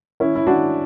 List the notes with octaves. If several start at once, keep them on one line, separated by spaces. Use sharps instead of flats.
C#4 E4
E4
D4 F#4